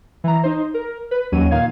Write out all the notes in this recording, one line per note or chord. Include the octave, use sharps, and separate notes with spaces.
E3 A#5
D#4 C5
A#4
B4
D#2 F#3 C#4 D#7
A#2 D#3 F5 G#6